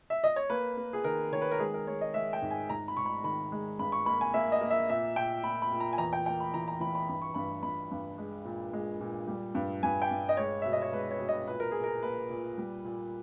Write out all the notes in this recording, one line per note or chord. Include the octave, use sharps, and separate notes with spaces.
E5
D#5
C#5
A#3 B4
A#3
G#4
D#3 A#4
D#3 C#5
B4
A#4
G#3 G#4
A#4
G#3 C#5
D#5
G#3 E5
G5
G#2
G#5
G#2 A#5
B5
G#2 C#6
B5
D#3 B5
G#3
G2 B5
C#6
A#3 B5
G#5
A#3 E5
D#5
A#3
E5
A#2 E5
A#2 G5
A#2 B5
B5
A#2
A#5
G#5
E2 A#5
G5
A#3 G5
B5
E3 A#5
A#5
E3 B5
B5
G2 B5
C#6
G2 B5
G2 B5
G2
G#3
A#2
G#3
A#2
G3
G2
G2 G#5
G5
G2
D#5
G#3 C#5
B2 E5
D#5
C#5
G#3 B4
C#5
B2
D#5
A#2 B4
A#4
A#2 G#4
A#4
A#3 B4
A#2
G3
A#2